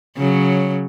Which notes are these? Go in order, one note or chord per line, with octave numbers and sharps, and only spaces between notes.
C#3 F#3